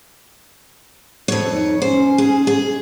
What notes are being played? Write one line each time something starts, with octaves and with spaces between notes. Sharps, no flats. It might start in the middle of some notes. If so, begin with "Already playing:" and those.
F2 C#5
D#4
C#4 C5
G#4
G#4